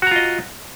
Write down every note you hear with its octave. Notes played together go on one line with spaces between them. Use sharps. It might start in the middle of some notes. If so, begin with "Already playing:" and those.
F4 F#4 D#5 A#5